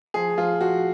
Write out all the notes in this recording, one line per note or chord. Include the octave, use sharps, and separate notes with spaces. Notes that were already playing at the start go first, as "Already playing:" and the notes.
F3 G#4
F3 F4
F3 F#4